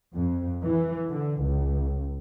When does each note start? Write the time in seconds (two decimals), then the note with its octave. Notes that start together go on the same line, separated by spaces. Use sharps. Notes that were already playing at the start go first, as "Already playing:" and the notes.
0.14 F2
0.64 E3
1.07 D3
1.41 C#2